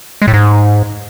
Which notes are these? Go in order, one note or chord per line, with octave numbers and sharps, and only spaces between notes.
G#3
A2
G#2